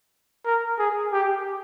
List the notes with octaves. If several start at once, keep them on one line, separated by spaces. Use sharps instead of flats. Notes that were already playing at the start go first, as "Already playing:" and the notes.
A#4
G#4
G4